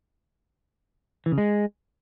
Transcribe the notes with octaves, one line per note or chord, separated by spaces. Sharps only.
E3
C#3
G#3